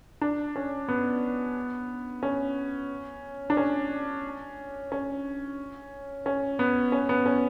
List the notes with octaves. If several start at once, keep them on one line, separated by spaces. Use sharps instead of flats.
D4
C#4
B3
C#4
D4
C#4
C#4
C#4
B3
C#4
B3
C#4